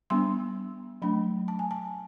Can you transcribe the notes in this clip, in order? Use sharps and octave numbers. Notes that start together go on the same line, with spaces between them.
G3 B3 D4 C6
F#3 A3 D4 B5
A5
G#5
A5